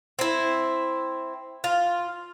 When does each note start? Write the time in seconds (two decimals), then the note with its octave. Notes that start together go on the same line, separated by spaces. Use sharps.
0.19 C4 E4
1.64 F4